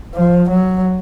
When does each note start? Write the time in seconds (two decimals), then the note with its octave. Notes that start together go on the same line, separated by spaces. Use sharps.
0.15 F3
0.50 F#3